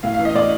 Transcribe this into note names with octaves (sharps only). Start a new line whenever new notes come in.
A2 F5
F5
E3
D#5
A2 D5